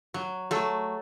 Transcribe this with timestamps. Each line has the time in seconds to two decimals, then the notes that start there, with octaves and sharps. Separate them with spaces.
0.14 F#3
0.51 F#3 A3